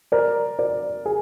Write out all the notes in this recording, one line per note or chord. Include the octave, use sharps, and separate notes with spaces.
A#4 D5
A#4 D5
G#4